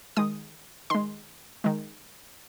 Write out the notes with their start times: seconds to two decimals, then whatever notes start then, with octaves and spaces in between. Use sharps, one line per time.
0.17 D#3 G#3 D#6
0.90 D#3 G#3 C6
1.64 D#3 G#3